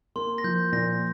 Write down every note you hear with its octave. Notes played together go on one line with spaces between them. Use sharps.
A#3 C6
A#6
F3 G6
A#2 A#6